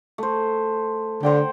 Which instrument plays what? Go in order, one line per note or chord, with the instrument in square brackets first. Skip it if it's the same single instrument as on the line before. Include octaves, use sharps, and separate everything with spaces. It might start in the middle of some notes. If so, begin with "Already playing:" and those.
[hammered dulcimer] A3 C5
[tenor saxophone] D3 [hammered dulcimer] C5 F#5 G5